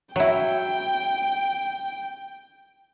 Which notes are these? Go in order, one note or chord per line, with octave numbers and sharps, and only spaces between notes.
F#3 E4 G5